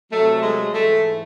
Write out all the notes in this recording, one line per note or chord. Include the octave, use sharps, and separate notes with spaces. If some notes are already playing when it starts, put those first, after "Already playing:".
C3 F#3 A3
G#3
G#2 E3 A3